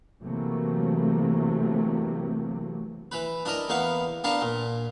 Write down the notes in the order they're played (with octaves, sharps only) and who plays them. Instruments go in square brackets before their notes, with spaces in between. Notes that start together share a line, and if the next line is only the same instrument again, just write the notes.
[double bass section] C3 E3 F#3 A3 A#3
[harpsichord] E3 B4
D4 E4 A#4 D#5
E2 A#3 B3 F5 C#6
B3 D4 A#4 F5 A5
A#2